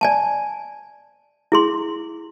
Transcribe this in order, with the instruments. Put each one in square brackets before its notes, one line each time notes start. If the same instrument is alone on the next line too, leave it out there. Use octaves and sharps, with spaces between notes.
[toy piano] D5 G#5 A5
E4 G#4 C6